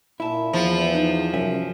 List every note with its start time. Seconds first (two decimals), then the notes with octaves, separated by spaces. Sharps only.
0.20 A#2 E4 A5
0.53 E2 F3
0.95 D#4
1.33 C2 F#2 E5 G#5